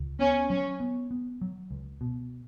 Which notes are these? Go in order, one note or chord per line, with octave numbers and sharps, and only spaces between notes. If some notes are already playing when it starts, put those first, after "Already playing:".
Already playing: C#2
B3 C#4
F#3 C#4
B3
B3
F#3
C#2
B2